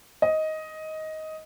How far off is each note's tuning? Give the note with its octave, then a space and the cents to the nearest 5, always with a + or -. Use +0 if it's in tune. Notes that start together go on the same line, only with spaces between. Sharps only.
D#5 +10